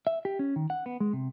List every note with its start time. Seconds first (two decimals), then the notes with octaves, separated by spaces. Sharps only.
0.07 E5
0.25 G4
0.39 C#4
0.56 D#3
0.70 F#5
0.86 B3
1.00 G#3
1.13 C3